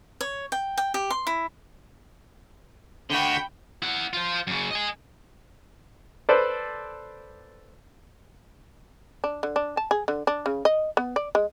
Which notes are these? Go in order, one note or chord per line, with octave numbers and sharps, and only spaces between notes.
C#5
G5
G5
G4
C6
E4
D3 F#4 G5 B5
E4 F#5
F4 C5
F#2 C#3
D#5 G#5
A4 B4 C5 D5
D4
D3
D4
A5
G#4
D3
D4
C#3
D#5
B3
D5
G#3